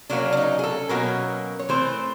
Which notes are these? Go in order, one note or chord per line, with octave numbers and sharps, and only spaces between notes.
C#3 F#3 A#3 C#4 D4
D4
D#4
G#4
A4
B2 F#3 A#3 C#4 A#4
C#5
E3 A3 C4 C5